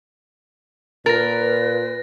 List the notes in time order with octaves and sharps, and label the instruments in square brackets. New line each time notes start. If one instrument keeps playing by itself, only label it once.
[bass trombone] A#2 [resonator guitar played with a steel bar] A#4 [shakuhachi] B4 [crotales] A6 A#6